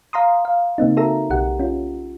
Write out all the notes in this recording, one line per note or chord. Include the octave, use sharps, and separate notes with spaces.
F5 A#5 C6 D#6
F5
C#3 A#3 C4 D#4
F#4 A4 A#4 E5 A#5
B1 G4 F#5
C#4 F4